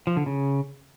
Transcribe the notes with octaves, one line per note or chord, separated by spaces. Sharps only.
F3
D3
C#3